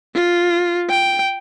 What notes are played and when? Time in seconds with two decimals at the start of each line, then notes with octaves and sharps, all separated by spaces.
0.15 F4
0.90 G5